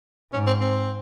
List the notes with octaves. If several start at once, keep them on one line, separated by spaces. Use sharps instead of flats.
G#2 C#4
C4
C4